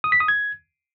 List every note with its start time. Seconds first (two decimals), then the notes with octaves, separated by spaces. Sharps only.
0.04 D#6
0.12 B6
0.20 D#6
0.28 G#6